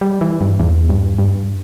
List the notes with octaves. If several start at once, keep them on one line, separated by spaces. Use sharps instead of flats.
G3
E3
G2
E2
G2
G2